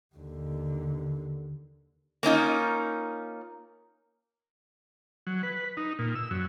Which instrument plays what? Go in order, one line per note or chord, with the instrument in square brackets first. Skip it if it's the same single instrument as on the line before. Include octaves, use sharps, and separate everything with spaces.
[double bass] D#2 D3
[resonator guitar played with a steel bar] A#3 C#4 D#4 F4
[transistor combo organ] F#3
B4
D#4
A#2
E6
F#2